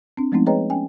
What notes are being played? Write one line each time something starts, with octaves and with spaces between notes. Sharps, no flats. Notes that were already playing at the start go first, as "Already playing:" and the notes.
C4 D4
F3 G#3 A3 B3 C4 D#4
G#4 B4 C#5 D#5 G5 A#5
C#4 G5 G#5